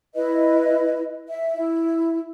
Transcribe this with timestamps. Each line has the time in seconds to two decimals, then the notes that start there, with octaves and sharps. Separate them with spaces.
0.15 E4 B4 D#5
1.28 E5
1.54 E4